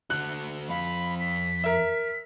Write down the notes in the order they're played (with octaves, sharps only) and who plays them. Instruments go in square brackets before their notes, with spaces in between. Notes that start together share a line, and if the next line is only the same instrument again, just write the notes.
[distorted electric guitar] D3 F#4 [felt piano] F#6
[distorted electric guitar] F2 F5 [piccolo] B5
[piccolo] B6
[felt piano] A#4 E5